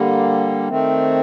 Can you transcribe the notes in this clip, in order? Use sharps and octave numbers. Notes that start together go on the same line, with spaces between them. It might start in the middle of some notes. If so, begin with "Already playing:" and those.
Already playing: D3 G3 A#3
D#3 A3 C4